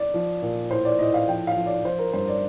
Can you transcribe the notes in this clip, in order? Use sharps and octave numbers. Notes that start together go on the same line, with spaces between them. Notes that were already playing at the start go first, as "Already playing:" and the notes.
Already playing: D5
F3
A#2
A2 C5
D5
A2 D#5
F5
F3 G5
F5
F3
D5
F3 C5
A#4
G2 C5
D5